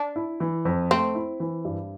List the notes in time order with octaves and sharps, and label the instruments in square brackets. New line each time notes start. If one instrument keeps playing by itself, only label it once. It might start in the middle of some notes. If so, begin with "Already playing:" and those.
Already playing: [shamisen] D4
[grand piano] E4
E3
F2
[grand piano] A3 [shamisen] C4
[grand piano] E4
E3
G2